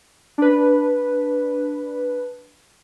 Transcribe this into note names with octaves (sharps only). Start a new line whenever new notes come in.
D4 B4